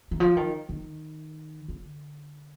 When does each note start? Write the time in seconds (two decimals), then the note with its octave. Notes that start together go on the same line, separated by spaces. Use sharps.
0.11 D#3
0.20 F3
0.37 D#3
0.69 D#3
1.68 D3